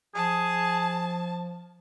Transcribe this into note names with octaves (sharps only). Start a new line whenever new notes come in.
F3 G#4 A5